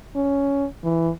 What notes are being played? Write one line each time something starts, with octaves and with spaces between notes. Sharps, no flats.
C#4
E3